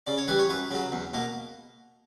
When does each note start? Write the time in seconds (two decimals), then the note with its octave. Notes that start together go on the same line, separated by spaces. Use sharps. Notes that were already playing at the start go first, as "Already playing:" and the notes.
0.07 C#3 D5
0.18 C#5
0.28 E3 G3 B4
0.39 C#5
0.49 F#2 B4
0.71 C#3 F#3
0.92 E2
1.13 B2 A#3